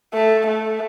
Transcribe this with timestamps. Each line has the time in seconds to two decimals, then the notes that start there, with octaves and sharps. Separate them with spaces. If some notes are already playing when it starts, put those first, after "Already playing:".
0.14 A3
0.47 A3